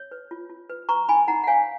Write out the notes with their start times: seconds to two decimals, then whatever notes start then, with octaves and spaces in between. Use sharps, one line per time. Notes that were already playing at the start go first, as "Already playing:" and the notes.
Already playing: C#5
0.11 B4
0.31 F4
0.50 F4
0.70 B4
0.89 B4 A#5 C#6
1.08 D#4 G#5 B5
1.28 D#4 F#5 A#5
1.43 F#5
1.47 C#5 F5 G#5